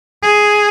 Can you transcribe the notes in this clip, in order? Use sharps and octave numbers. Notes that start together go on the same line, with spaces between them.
G#4